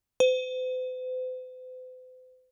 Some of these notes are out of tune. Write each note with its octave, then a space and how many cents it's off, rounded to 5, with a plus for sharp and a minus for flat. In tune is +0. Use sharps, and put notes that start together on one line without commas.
C5 -45